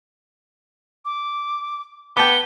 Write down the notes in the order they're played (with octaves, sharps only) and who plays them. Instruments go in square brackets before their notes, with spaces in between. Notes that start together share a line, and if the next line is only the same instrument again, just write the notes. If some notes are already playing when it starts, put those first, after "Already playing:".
[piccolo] D6
[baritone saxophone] B3 [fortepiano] G5 A5 D6 [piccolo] G7